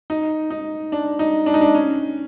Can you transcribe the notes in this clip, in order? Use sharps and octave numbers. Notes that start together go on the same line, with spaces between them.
D#4
D#4
D4
D#4
D4
D#4
D4
C#4